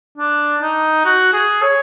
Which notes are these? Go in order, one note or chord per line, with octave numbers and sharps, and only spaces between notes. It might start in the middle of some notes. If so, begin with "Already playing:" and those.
D4
D#4
F#4
G#4
C#5